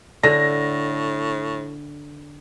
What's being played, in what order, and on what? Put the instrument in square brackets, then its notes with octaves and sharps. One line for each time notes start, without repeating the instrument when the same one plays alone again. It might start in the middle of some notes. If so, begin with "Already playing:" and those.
[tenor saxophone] A2 [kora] D3 [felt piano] A#6